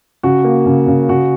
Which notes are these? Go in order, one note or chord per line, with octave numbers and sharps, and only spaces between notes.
C#3 F#4
A#3
C#3
C#3
C#3 F#4